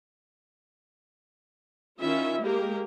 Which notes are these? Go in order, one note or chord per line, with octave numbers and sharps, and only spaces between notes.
D#3 C#4 E4 F4 E5
G#3 A#3 G4 A#4